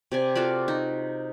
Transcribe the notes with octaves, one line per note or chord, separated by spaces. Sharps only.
C3 D5 G#5
F4 F#4 A4 D5
D#4